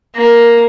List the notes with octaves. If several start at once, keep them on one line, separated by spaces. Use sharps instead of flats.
A#3